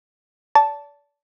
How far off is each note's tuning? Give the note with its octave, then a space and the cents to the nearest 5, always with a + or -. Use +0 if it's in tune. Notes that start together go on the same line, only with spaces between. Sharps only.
D5 -35 A5 +0